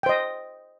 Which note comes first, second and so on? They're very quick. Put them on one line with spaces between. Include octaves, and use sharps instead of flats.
G5 C5 D#5